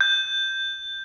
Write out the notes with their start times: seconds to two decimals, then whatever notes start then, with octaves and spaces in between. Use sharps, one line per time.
0.01 G6